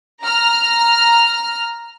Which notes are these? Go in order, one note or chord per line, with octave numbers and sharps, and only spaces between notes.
A#5 F6